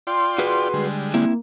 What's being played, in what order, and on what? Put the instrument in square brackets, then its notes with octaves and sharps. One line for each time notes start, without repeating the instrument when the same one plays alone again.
[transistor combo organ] F4 D5 G5 [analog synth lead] C6
[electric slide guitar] F#4 G#4 B4
[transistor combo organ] D3 G3 G#3
[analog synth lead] A#3 [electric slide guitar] C4 E4